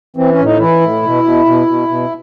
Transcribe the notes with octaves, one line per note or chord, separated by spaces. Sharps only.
E3 C4
C#4
A2
D#4
E3 E4
A2
B2
B2
B2
B2
B2